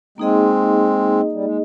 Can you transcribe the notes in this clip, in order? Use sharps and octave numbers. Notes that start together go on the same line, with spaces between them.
G#3 A#3 C4 D#4 G#4 D#5
G3
G#3